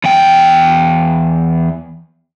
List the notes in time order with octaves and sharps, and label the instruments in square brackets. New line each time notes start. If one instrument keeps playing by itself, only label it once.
[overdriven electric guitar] E2 G5